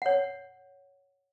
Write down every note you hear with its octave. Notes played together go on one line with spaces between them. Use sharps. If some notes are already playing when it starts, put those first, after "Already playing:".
C#5 F#5